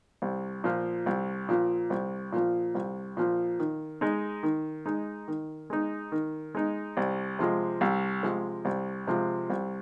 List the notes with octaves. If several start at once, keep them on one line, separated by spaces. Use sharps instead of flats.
C2
A#2 F3
C2
A#2 F3
C2
A#2 F3
C2
A#2 F3
D#3
G#3 D#4
D#3
G#3 D#4
D#3
G#3 D#4
D#3
G#3 D#4
C2
C3 F3 G#3
C2
C3 F3 G#3
C2
C3 F3 G#3
C2